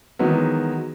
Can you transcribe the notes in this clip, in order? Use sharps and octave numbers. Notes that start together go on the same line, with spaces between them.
D#3 E3 F#3 G#3 B3